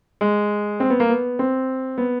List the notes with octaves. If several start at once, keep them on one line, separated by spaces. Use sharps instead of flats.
G#3
C4
B3
A#3
B3
C4
B3